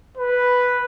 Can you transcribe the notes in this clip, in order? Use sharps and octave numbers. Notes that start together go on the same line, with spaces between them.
B4